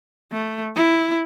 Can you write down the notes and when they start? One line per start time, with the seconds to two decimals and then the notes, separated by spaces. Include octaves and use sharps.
0.32 A3
0.76 E4